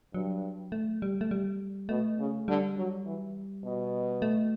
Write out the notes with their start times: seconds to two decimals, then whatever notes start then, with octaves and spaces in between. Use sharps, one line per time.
0.14 G2 F#3
0.72 A3
1.02 G3
1.21 A3
1.31 G3
1.89 B2 A3
2.19 C#3
2.48 D3 G3
2.77 F#3
3.05 E3
3.64 B2
4.22 A3